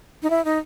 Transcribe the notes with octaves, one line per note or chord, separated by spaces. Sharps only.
D#4
E4
D#4